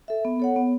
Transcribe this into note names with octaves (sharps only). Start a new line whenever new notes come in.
A4 E5
B3
A4 C#5 F#5
B3